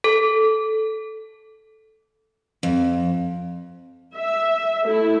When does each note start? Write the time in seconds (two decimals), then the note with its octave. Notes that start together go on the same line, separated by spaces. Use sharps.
0.04 A4
2.63 F2
4.15 E5
4.84 A3 E4